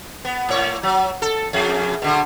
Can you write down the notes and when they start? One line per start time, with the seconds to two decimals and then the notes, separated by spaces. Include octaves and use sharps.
0.25 B3
0.49 A2 C#5
0.83 F#3
1.22 A4
1.53 F2 G#4
2.02 B2 D3